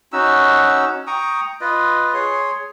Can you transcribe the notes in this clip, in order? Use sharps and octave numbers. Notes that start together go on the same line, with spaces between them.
C#4 D#4 F#4 E6
G5 A#5 C#6 D#6
F4 B4 D#5
G#4 C#5 C6